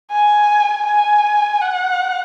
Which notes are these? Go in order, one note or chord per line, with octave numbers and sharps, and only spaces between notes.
G#5
G#5
F#5